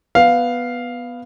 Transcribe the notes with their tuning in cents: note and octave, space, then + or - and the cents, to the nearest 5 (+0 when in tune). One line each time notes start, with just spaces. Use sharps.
B3 +0 F5 +0